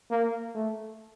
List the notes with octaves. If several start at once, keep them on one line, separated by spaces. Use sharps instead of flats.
A#3
A3